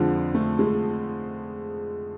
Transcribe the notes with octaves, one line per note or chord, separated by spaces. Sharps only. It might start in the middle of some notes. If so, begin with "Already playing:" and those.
Already playing: F2 D3 F3 G#3
A3
G#3